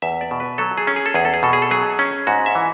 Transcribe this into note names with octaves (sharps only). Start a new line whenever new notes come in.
E2 E5
D5
B2
B4
F#3 A4
G#4
C#4
G#4
A4
E2 G#4
A4
G#4
B2 A4
G#4
A4
F#3 G#4
C#4
G#2 F#4
E5
E3